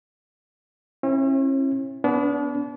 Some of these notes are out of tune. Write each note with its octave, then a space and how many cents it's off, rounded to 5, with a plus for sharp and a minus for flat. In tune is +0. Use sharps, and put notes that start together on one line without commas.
C#4 -45 E4 +0
B3 +0 D4 -35